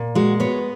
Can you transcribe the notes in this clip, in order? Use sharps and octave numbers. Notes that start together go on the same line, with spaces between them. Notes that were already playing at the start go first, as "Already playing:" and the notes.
Already playing: A#2
G#3 F#4
B3 C#5